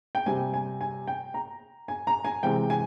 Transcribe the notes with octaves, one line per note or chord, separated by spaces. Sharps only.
G5
C3 G3 G#5
G#5
G#5
G5
A#5
G#5
A#5
G#5
C3 E3 G#3 G5
G#5